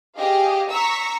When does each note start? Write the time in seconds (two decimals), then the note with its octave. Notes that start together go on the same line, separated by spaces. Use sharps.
0.17 G4 G#4 D#5 F5
0.70 A#5 C#6 E6 B6